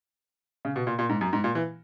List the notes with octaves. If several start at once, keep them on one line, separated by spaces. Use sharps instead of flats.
C#3
B2
A#2
A#2
G#2
F#2
G#2
A#2
E3